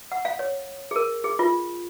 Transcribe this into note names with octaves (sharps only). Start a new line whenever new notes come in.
F#5
F5
C#5
G#4
A#4
G#4
F4